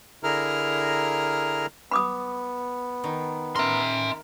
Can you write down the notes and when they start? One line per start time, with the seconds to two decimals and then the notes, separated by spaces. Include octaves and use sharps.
0.24 D3 E4 G#4 A#4 A#5 F6
1.91 B3 B5 D6 D#6
3.04 D#3
3.56 A#4 E5 C6